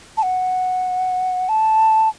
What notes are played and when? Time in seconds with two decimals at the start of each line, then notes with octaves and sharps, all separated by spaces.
0.17 A5
0.23 F#5
1.49 A5